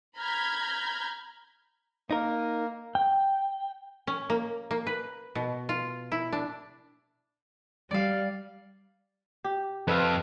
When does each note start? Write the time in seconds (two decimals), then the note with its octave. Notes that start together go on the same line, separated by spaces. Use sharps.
0.17 A#5 B5 F6 G6 G#6
2.11 A#3 D#4 A#4
2.95 G5
4.07 C#4
4.30 A#3
4.71 A#3
4.87 B4
5.35 B2
5.69 F4
6.12 E4
6.33 D4
7.91 G3 D5 F5
9.44 G4
9.88 F2 B4 E5 F5